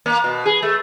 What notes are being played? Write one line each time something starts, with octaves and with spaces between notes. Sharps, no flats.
A#3
B2
G#4
A3